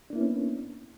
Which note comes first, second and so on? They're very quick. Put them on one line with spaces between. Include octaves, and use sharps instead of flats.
D4 A#3 E4 B3 C#4